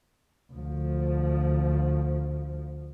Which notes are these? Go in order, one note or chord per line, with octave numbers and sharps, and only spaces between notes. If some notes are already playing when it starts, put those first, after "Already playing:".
D2 F3